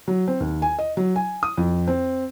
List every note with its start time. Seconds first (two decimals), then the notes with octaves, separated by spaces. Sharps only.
0.08 F#3
0.28 C4
0.40 D#2
0.62 G#5
0.79 D#5
0.97 F#3
1.16 G#5
1.43 D#6
1.58 F2
1.87 C4